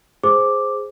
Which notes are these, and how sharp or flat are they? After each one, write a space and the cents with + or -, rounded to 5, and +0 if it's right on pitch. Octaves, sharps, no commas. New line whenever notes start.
G#4 +0 C5 +0 D6 +0